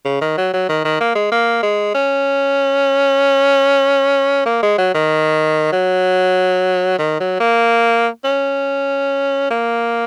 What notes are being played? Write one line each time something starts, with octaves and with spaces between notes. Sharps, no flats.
C#3
D#3
F#3
F#3
D#3
D#3
A#3
G#3
A#3
G#3
C#4
A#3
G#3
F#3
D#3
F#3
D#3
F#3
A#3
C#4
A#3